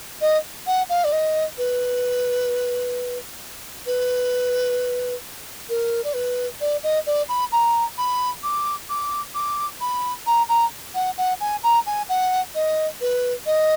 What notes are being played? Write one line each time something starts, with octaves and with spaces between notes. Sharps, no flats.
D#5
F#5
F5
D5
D#5
B4
B4
A#4
D5
B4
D5
D#5
D5
B5
A#5
B5
D6
D6
D6
B5
A#5
A#5
F#5
F#5
G#5
A#5
G#5
F#5
D#5
B4
D#5